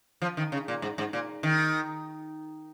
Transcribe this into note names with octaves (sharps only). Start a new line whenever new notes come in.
F3
D#3
C#3
A#2
G#2
G#2
A#2
D#3